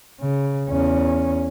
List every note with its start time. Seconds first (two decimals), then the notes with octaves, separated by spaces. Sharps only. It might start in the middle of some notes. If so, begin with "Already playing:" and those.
0.21 C#3
0.69 E2 C#4